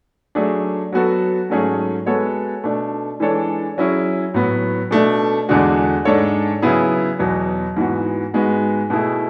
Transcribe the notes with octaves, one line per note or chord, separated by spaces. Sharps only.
F#3 A3 D4 G#4
F#3 B3 F#4 A4
G#2 F#3 A3 C#4 G#4
G#3 B3 F#4 A4 C#5
B2 A3 D4
E3 G#3 D4 A4 C#5
F#3 C#4 E4 G#4
A2 F#3 B3
B2 A3 D4
E2 D3 G#3 D4 F#4
G#2 G#3 D4 A4 C#5
C#3 F#3 B3 E4 G#4
E2 B2 F#3
G#2 E3 B3 F#4
G#2 G#3 B3 F#4
B2 A3 E4 G#4